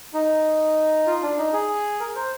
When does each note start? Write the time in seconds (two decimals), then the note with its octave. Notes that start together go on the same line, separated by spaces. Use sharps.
0.14 D#4
1.07 F4
1.23 D4
1.37 D#4
1.53 G#4
2.00 A#4
2.15 C5